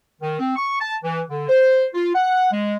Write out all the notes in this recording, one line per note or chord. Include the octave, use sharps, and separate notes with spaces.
D#3
C4
C#6
A5
E3
D3
C5
F4
F#5
G#3